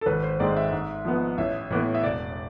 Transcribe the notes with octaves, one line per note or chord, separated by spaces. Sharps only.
A4
G#1 B4
C5
G#2 G#3 C4 D5
E5
G#2
F3 B3
A1 E5
A2 E3 B3
E5
E1 D5